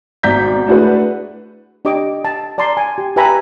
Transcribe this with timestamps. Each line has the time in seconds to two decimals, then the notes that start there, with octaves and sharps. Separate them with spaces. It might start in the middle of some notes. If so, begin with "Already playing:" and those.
0.23 G#1 B2 D5 A#5 G6 B6
0.67 A3 D4 E4 F#4 G#4 B4
1.85 D4 G4 D#5 D6
2.25 A5
2.58 D5 A5 A#5 C6
2.77 G#5
2.98 G4
3.16 G4 B4 E5 G#5 A#5 B5